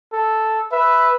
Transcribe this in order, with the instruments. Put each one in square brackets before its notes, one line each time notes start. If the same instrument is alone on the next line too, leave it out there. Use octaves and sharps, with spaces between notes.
[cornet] A4
[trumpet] B4 [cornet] E5